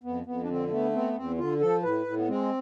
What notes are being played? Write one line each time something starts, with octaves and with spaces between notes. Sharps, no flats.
F2 B3
F2 B3
D4
D3 C4
A3 B3
B3 C4
E2 C4
D3 F4
F3 A4
A2 B4
A2
B3
G#3 C4